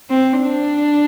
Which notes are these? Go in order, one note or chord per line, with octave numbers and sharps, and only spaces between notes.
C4
D4